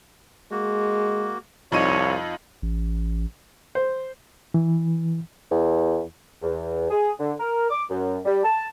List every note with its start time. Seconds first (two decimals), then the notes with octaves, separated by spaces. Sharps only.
0.51 G#3 A#3 F#4
1.72 C2 F2 D#4 C#5 D#7
2.62 A1
3.75 C5
4.54 E3
5.51 E2
6.42 E2
6.89 G#4
7.19 D3
7.38 A#4
7.70 D6
7.90 F#2
8.25 G3
8.43 A5